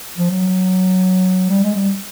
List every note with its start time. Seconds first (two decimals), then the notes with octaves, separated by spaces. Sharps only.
0.17 F3
0.31 F#3
1.50 G3
1.63 G#3
1.75 G3